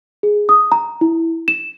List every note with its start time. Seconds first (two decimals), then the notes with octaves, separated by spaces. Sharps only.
0.23 G#4
0.49 D#6
0.72 A#5
1.01 E4
1.48 E7